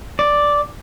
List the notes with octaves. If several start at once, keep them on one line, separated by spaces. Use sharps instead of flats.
D5